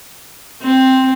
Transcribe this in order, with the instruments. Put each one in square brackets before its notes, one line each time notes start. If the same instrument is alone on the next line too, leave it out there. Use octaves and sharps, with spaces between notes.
[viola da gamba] C4